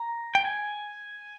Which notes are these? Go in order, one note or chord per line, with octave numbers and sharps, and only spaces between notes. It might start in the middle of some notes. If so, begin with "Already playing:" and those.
Already playing: A#5
G5
G#5